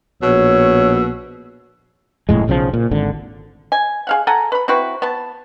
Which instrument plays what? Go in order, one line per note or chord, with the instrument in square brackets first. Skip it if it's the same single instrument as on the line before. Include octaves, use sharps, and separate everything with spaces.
[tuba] A#1 [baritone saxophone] B2 [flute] C#5 [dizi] E6
[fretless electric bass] F1 C2 A2 G#3
B1 C#3 E3 F3
A#2
G#1 D3
[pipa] G#5
G#4 F5 F#5
A4 F#5 G#5 A#5
B4 B5
C4 E4 F#4 B4
B3 A5